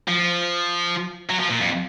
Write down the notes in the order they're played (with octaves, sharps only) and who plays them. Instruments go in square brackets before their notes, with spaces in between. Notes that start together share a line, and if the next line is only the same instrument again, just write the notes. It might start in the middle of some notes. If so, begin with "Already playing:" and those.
[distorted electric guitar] F3
F#3
F3
A#2
F2